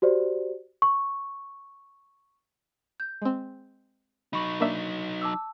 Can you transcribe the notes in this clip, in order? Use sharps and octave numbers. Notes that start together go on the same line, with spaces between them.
F#4 G4 C5 D5
C#6
G6
G#3 C4
F#3 D#4 B5 C#6 F#7
A#3 D4 E5
A5 D6 E6